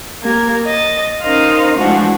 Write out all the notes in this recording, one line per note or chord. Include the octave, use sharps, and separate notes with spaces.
A#3 G4 A#4 G#6
D#5 A6
C#4 D#4 A#4 C5 D#5 F5
E3 F3 G#3 A3 D4 F#4